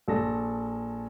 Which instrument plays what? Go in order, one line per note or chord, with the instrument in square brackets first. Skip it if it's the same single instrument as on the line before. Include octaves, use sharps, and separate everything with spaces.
[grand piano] A#1 A4 A#6